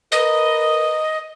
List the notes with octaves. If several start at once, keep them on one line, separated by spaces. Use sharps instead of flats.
A#4 B4 D#5